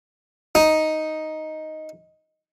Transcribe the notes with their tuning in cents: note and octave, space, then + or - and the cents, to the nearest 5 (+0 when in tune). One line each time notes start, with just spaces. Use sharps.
D#4 +5